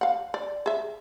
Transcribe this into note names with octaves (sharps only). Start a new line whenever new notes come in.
F5 F#5
D5
G#4 E5